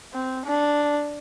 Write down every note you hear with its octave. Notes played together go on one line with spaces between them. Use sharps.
C4
D4